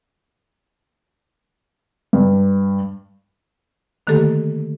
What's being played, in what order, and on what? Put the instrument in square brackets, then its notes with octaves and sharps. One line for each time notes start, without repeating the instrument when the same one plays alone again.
[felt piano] G2
[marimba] D3 D#3 A3 A#3 G4 A4